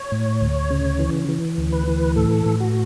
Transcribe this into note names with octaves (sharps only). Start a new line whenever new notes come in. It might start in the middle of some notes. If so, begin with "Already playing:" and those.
Already playing: C#5
A2
D2
C#3
E3
E3
D2
B4
E3
A2 A4
A2
F#4